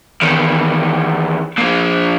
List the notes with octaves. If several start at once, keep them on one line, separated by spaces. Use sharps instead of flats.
E2 D#3
A#2 F3